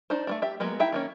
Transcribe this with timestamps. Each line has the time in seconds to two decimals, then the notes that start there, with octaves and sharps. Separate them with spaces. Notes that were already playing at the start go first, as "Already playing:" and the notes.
0.10 D4 D#4 C5
0.27 A3 A#3 D4
0.42 G4 E5
0.60 F#3 G#3 A#3 B3
0.80 D#4 E4 E5 F5 G5
0.92 D#3 A#3 C#4